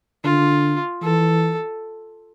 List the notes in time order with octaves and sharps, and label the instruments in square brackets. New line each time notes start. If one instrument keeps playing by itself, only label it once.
[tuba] D3 [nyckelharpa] F4
[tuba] E3 [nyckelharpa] A4